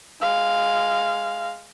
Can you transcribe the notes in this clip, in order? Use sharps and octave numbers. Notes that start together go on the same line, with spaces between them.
G#3 F5